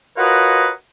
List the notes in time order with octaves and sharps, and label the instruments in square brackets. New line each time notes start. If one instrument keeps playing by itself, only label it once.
[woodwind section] F4 F#4 A#4 B4 C#5 D#5